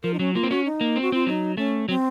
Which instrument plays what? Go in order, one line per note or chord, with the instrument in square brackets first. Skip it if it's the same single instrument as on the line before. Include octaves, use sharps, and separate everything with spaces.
[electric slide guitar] F3 [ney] A#4
[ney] D#4
[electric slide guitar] F#3 [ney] C#4
[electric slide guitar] A#3 [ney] F4
[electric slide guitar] C4
[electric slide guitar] C#4 [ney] F#4
[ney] D#4
[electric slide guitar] A#3
C4
[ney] F#4
[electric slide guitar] C4 [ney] F4
[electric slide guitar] F#3 [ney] D#4
[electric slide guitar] A3 [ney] C#4
[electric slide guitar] F#3 [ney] C4